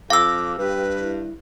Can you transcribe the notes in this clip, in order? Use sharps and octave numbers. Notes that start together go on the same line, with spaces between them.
F2 F5 D6 E6
G2 G4 B4
E4